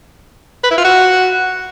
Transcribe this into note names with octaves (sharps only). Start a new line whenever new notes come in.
B4
E4
F4
F#4